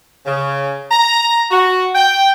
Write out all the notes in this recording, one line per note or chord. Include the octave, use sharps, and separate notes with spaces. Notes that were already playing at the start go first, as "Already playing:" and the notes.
C#3
A#5
F#4
G5